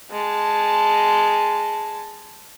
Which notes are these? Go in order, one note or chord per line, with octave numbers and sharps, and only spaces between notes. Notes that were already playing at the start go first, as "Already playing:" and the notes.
G#3 A5